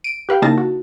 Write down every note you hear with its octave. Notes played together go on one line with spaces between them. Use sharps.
D7 D#7
G4 B4 F5 G5
C#3 A#3 D#4 E4 A5 A#6
F#4